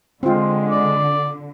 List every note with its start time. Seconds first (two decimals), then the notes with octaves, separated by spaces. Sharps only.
0.23 D3 G#3 C4 F4
0.70 D5